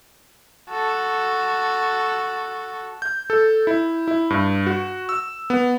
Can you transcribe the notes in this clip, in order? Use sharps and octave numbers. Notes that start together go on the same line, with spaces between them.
F#4 A4
G6
A4
E4
E4
G2
F#4
E6
B3